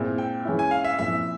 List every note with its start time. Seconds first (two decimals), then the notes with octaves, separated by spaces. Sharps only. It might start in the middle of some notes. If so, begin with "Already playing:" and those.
Already playing: A#2 G#3 C4 E4
0.18 G5
0.45 E3 G#3 C#4 E4
0.59 G#5
0.71 F5
0.84 E5
0.99 A#2 F3 C4 E4 E5